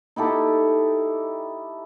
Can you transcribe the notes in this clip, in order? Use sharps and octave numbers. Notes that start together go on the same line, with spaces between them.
D#4 E4 G4 A4